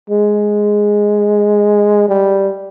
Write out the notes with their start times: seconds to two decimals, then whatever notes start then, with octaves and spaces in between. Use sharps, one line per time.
0.10 G#3
2.08 G3